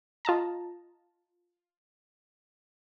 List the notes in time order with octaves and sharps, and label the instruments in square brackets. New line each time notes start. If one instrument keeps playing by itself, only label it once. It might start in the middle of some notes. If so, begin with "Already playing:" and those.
[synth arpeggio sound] F4 D#5 A5 A#5